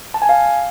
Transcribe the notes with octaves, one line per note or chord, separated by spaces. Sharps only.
A5
G#5
F5